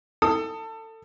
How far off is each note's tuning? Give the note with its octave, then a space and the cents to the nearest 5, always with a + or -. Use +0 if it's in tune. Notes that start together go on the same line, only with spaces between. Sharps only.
A4 +25 D#6 +0